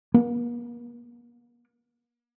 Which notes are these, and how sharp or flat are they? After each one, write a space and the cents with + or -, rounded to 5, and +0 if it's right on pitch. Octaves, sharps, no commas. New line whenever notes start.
A#3 +45